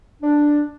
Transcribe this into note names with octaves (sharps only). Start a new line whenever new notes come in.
D4